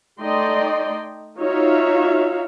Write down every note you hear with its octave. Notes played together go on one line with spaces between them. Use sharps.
A3 D#4 D5 D#5 G5 C6
D#4 F4 F#4 C#5 E5 F5